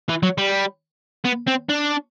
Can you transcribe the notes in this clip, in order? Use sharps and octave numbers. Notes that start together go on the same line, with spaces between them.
E3
F#3
G3
B3
C4
D4